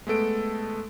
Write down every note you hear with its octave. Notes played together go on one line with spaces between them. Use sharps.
G#3 A3 B3 A4 D7